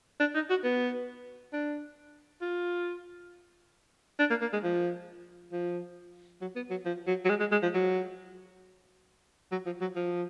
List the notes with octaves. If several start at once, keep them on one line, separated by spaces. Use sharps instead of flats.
D4
D#4
F#4
B3
D4
F4
D4
A#3
A#3
G#3
F3
F3
F#3
B3
F#3
F3
F#3
F#3
G#3
G#3
G#3
F3
F#3
F#3
F3
F#3
F3